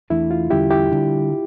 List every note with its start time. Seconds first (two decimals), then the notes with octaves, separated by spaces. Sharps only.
0.10 E2 E3 A3 D4 E4
0.31 F4
0.50 E2 D3 G3 C#4 E4 G4
0.70 E4 G4
0.91 D3 G3 D4